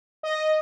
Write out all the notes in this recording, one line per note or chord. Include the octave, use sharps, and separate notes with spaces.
D#5